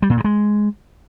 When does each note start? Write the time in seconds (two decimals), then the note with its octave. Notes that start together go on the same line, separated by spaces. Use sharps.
0.02 G3
0.10 A#2
0.17 G2
0.24 G#3